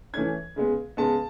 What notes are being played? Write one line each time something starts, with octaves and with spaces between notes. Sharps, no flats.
E3 A3 C#4 G#6
C#3 G#3 B3
C#3 G#3 B3 A5